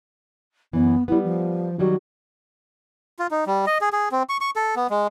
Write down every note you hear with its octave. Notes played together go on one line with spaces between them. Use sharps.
F#2 E3 B3
G3 B3 E4
F3
D#3 F#3 G3 F#4
F4
D#4
G3
D#5
G#4
G#4
C4
C#6
C#6
A4
B3
G#3